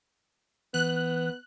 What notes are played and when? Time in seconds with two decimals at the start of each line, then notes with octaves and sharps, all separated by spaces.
0.74 E3 B3 F#6